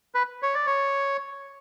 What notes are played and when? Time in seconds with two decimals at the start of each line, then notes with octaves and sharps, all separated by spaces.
0.15 B4
0.43 C#5
0.54 D5
0.67 C#5